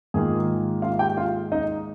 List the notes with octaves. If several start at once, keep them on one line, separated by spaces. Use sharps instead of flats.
G#2 D#3 A#3 F4 G#4
F4 F5
G4 G5
F4 F5
D#4 D#5